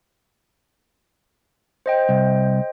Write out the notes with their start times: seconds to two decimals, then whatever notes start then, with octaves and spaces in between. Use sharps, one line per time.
1.86 C5 D#5 G5
2.09 C2